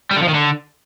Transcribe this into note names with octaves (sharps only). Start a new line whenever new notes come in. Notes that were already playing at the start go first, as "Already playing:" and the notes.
G3
D3
F3
D#3
D3